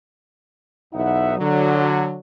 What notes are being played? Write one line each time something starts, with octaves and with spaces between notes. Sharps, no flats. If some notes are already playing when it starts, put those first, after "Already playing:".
B1 E2 D#4 E4 E5 F#5
D3 F#3